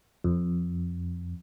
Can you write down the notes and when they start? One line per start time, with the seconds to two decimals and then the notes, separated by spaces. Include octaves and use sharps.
0.24 F2